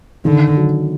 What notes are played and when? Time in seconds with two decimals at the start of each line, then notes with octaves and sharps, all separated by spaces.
0.25 D3 D#3
0.57 F#3